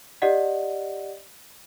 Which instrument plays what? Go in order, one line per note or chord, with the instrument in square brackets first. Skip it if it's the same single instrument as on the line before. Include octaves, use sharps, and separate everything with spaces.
[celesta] G4 D5 D#5 F#5